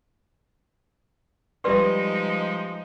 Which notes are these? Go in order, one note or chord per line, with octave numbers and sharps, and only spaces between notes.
F3 G3 G#3 D#4 B4 D5 C6 C#6